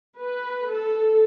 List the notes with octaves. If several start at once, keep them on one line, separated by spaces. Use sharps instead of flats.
B4
A4